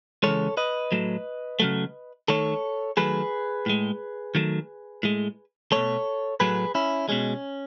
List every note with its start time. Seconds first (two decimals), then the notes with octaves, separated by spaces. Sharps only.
0.23 C#3 E3 G#3 A4 C#5
0.57 B4 D#5
0.92 A2 F#3 A3
1.60 C#3 F#3 A3
2.28 D#3 A3 A4 C#5
2.97 D#3 F#3 A3 G#4 B4
3.66 A2 G#3
4.35 D#3 F#3 A3
5.03 A2 G#3
5.72 B2 A3 A4 C#5
6.40 A2 F#3 A3 G#4 B4
6.75 C#4 E4
7.09 B2 G#3 C#4